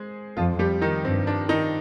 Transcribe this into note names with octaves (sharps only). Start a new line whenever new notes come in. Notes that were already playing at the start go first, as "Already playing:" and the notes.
Already playing: G#3 G#4 C5
F2 F3 F4
G3 G4
D#3 D#4
G2 C4
D4
D#3 D#4